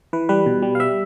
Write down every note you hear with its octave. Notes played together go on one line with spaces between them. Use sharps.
E3 B4
G3 B4
B2
G3
F5
G3 E5